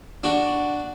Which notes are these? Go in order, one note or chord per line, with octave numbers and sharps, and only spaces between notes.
D4 F#4